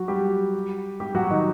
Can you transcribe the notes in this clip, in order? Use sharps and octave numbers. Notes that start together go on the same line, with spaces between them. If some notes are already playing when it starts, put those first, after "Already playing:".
Already playing: F#3 F#4
G3 G4
G3 G4
F#3 F#4
D#3 D#4